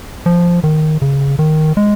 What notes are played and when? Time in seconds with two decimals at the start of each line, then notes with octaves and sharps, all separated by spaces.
0.26 F3
0.64 D#3
1.02 C#3
1.39 D#3
1.77 G#3